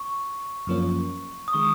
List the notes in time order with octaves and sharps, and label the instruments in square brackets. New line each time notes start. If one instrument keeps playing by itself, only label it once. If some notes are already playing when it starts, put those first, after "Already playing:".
Already playing: [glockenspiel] C#6
[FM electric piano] F#2 F3 A#3 C#4
[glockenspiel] D#6
[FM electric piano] D#3 G#3 [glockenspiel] C#6